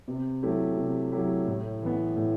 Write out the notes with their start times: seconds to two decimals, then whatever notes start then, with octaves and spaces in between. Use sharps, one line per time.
0.08 C3
0.43 F#3 A3 E4 G4
0.77 C3
1.12 F#3 A3 E4 G4
1.48 A2
1.82 E3 B3
2.16 A2